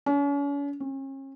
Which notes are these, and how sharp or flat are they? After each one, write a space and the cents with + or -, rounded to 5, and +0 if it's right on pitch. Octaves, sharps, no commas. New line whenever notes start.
C#4 +40
C#4 -40